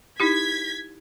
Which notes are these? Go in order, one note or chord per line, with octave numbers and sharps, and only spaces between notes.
D#4 E4 G4 G#6 B6